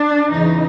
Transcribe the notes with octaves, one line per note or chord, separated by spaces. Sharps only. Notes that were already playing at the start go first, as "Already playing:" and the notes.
Already playing: D4
E2 C#3 E3 D#4